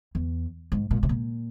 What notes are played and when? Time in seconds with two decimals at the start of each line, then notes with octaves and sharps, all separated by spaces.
0.15 E2
0.72 G#2
0.91 A#2
1.03 C3
1.09 A#2